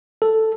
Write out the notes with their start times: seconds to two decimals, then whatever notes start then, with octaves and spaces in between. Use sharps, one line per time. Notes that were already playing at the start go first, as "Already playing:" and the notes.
0.22 A4